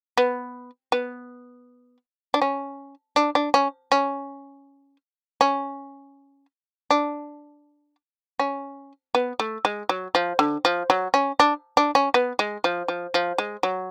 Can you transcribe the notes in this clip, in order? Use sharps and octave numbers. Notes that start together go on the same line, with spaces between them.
B3
B3
D4
C#4
D4
D4
C#4
C#4
C#4
D4
C#4
B3
A3
G#3
F#3
F3
D3
F3
F#3
C#4
D4
D4
C#4
B3
G#3
F3
F3
F3
G#3
F#3